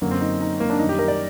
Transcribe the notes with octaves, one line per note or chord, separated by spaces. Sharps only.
F#2 D3 F#3 A#3
C4
D#4
D#4
A#3
D4
F#2 D#3 G3 D#4
G4
A#4
D5